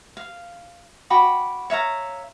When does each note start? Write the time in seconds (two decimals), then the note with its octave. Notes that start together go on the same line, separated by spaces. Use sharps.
0.17 F5
1.10 F#4 G5 B5 D6
1.70 C#5 E5 F5 A#5